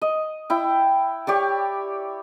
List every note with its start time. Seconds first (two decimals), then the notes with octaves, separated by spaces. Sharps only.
0.02 D#5
0.50 E4 G5
1.27 G4 C#5 D5